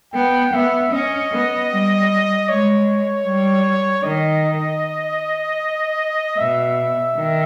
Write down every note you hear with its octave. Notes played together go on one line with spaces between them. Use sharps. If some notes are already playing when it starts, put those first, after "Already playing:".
B3 G5
B3 E5
C#4 D#5
B3
G3
G#3 C#5
G3
D#3 D#5
B2 E5
D#3